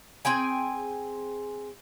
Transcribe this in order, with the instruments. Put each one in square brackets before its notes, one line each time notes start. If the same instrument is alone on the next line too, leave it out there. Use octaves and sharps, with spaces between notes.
[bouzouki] C4 G#4 G5 G#5